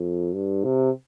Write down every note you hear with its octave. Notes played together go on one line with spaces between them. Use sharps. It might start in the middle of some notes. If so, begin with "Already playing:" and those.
Already playing: F2
G2
C3